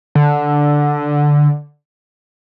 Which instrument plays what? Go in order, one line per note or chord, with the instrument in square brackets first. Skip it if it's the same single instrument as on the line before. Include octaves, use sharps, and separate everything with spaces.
[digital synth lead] D3